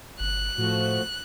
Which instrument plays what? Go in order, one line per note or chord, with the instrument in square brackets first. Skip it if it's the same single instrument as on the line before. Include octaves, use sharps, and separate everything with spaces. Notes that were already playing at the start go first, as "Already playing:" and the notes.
[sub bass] G1 [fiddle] F#6
[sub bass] A2 [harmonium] F3 A3 F#4